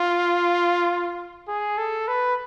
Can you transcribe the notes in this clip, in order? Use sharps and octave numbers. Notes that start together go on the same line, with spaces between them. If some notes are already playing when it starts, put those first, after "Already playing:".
Already playing: F4
G#4
A4
B4